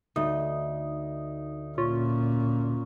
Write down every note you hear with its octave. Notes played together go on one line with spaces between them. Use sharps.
D2 D#4
A#2 C#4 F4